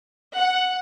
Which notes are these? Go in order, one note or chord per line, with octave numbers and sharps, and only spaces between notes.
F#5